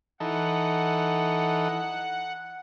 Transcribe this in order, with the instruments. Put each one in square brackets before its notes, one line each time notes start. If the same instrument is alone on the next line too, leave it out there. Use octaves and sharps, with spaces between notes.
[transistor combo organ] E3 D#4 A4 [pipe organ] F#5